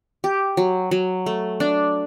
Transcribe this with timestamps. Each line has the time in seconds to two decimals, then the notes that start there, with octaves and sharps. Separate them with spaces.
0.24 G4
0.57 F#3
0.91 F#3
1.26 A3
1.60 D4